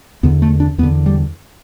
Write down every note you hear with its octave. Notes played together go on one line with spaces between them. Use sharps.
E2 D3 B3
A3
D4
E2 B3
D3
G3